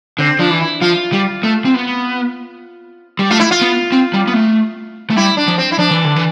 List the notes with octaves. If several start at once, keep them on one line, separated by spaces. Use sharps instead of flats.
D3 C4
F3 D4
E3
E4
F3 F4
G3
A3
C4
B3
G3
A3 F4
E4
F4
B3
C4
G3
B3
A3
A3
G3 E4
D4
F3
C4
E4
F3 D4
E3
D3
E3